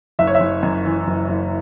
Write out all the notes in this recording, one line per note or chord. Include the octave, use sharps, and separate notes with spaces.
F#1 E5
C#5
E5
F#1
F#2
E3
F#1
F#1